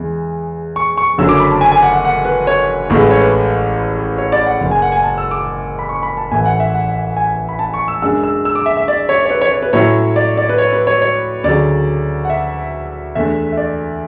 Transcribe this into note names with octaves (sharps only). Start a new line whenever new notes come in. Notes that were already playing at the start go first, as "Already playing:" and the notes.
Already playing: E2 C#3 E3 G#3
C#6
C#6
F#1 F#2 D3 F#3 C#4 E6
D6
B5
A5
G#5
G#5
F#5
F#5
F#5
B4
C#5
A1 A2 G#3
B4
C#5
B4
C#5
D5
F#5
F#1 F#2 C#3
G#5
F#5
G#5
A5
E6
D6
B5
C#6
B5
A5
A1 A2 E3 G#5
F#5
E5
F#5
G#5
B5
A5
C#6
E6
F#2 C#3 G#3 D4 E6
E6
E6
D6
E5
E5
D5
C#5
C#5
B4
C#5
C#5
B4
A2 F#3 C#4 E4 C#5
D5
D5
B4
C#5
B4
C#5
C#5
D2 C#3 F#3 D5
F#5
E5
E2 B2 A3 D4 E5
E5
D5